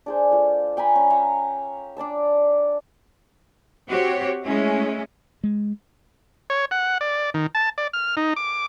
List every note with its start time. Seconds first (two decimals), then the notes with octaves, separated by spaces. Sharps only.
0.06 D4 G#4 C5
0.31 A3 F4
0.77 G5 G#5 A#5 B5
0.95 C#4
1.10 E5 F5 A#5 C#6
1.97 D4 D5 A5 E6
3.88 C4 F#4 G4 C#5
4.45 G#3 A3 C#4 E4
5.43 G#3
6.50 C#5
6.71 F#5
7.01 D5
7.34 D#3
7.55 A5
7.78 D5
7.93 F6
8.17 D#4
8.36 D6